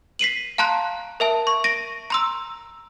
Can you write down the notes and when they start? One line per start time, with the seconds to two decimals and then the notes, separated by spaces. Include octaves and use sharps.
0.19 B6 C7 D#7 F#7
0.58 F5 A5 A#5 C6 F#6
1.20 A#4 E5 A5
1.47 C#6
1.64 A#6 D7 D#7
2.10 A#5 C6 E6